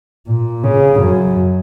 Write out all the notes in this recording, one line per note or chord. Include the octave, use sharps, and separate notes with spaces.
A#2
C#3
F#2